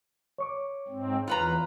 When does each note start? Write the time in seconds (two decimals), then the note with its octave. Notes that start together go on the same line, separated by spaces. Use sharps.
0.38 C#5 C#6 D6
0.88 G#2 C4
1.28 E2 F4 B4 A#5